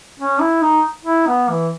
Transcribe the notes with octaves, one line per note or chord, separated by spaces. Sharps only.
C#4
E4
D#4
E4
B3
E3